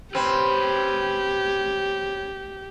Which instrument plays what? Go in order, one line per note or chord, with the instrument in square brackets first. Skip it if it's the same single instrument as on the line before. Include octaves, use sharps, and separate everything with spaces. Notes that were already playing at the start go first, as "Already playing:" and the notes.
[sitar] C4 [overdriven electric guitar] C#4 B4 [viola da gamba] G4